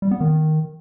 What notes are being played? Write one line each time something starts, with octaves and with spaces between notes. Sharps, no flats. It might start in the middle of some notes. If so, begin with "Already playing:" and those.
G3
B3
D#3